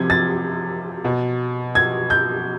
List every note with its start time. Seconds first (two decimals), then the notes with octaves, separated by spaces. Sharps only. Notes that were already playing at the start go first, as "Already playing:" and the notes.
Already playing: C3 F3 G#6
0.10 A6
1.05 B2
1.75 G#6
2.10 G6